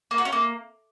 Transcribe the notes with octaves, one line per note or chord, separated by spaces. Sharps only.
A#3
F#4
C#4
A#3